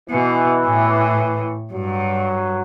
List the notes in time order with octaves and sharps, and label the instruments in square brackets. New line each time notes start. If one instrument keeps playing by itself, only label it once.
[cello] B2 [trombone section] E3
[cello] A2
[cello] G2 [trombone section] F#3